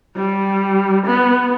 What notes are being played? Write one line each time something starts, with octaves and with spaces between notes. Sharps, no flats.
G3
B3